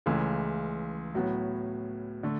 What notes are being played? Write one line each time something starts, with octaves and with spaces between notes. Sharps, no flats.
C#2 C#3 E3 A3
A2 F#3 B3
D3 A3